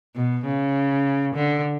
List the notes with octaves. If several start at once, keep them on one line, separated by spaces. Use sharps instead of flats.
B2
C#3
D3